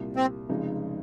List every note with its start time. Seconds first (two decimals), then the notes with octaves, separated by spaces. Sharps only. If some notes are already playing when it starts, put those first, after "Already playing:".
Already playing: C2 A#2 G3
0.16 C4
0.49 F1 F2 C#3 G#3 D#4